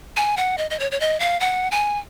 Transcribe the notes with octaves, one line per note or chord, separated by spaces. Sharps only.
G#5
F#5
D#5
D#5
C#5
C#5
D#5
F5
F#5
G#5